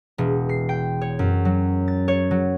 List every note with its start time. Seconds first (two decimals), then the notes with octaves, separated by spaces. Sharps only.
0.18 E1
0.49 C7
0.69 G5
1.01 C#5
1.19 F#2
1.45 F#3
1.88 A6
2.08 C#5
2.31 F#3